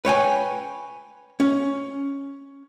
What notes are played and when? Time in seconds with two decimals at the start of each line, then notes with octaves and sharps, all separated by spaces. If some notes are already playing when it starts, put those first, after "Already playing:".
0.05 B4 C#5 G5 G#5
1.40 C#4